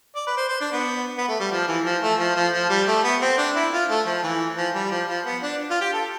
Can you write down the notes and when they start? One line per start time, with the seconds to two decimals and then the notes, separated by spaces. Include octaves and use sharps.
0.16 D5
0.27 B4
0.37 C5
0.49 C5
0.61 D4
0.73 B3
1.18 B3
1.29 A3
1.40 G3
1.52 F3
1.68 E3
1.85 F3
2.03 A3
2.19 F3
2.36 F3
2.53 F3
2.70 G3
2.88 A3
3.04 B3
3.22 C4
3.38 D4
3.55 E4
3.73 F4
3.90 A3
4.07 F3
4.23 E3
4.57 F3
4.75 G3
4.92 F3
5.08 F3
5.26 B3
5.43 D4
5.70 F4
5.81 G4
5.93 A4